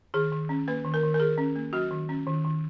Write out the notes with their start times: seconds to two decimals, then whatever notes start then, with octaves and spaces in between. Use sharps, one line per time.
0.14 D#3 G#4
0.32 D#3
0.49 C#4
0.68 A#3 B4
0.85 D#3
0.94 A#4
1.03 D#3
1.14 A#4
1.20 D#3 G#4
1.38 C#4
1.56 A#3
1.73 F#3 F#4
1.91 D#3
2.09 C#4
2.27 D#3
2.44 D#3